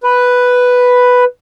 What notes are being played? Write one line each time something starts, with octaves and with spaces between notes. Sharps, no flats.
B4